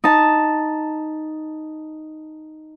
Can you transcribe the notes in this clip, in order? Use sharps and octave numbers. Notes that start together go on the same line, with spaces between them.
D#4 A5